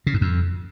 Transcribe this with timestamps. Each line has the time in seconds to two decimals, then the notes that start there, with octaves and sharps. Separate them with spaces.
0.07 C#3
0.14 G#2
0.21 F2